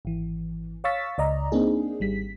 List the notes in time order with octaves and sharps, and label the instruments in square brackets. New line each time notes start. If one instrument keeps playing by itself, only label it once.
[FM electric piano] G#1 E3
C#5 F5 C#6 E6 A6 B6
C#2 D5 D#5 A#5
A#3 C4 D4 D#4 G#4
G#1 G3 B6